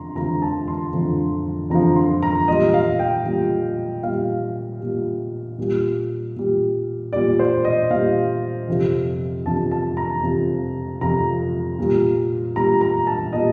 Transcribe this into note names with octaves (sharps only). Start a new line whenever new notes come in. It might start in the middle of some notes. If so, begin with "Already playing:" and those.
Already playing: F2 D3 A#5 C6
F2 D3 F3 A#5
A5
C6
F2 D3 F3
F2 D3 F3 A#5
C6
A#5
A#2 G3 D#5
F5
G5
A#2 G3
A#2 G3 F5
A#2 G3
A#2 G3
A#2 G3
A#2 G3 D5
C5
D#5
A#2 G3 F5
F2 C3 F3
F2 C3 F3 A5
A5
A#5
F2 C3 F3
F2 C3 F3 A#5
A#2 G3
A#2 G3 A#5
A#5
A5
A#2 G3 D#5